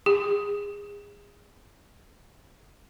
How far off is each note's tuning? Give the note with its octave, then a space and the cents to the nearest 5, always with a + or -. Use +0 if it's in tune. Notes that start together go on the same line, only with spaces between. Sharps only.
G#4 -25